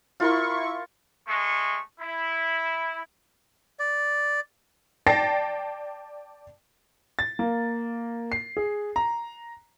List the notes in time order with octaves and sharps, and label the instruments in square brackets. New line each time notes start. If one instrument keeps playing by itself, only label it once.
[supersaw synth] E4 C#6 [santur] F4 A#4 C6
[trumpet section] G#3 A3 C#6
E4
[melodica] D5
[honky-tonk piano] D5 G5 A5 A6 A#6 C7
[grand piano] A6
A#3
C7
G#4
A#5